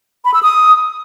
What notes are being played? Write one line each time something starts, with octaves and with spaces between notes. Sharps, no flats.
B5
E6
D#6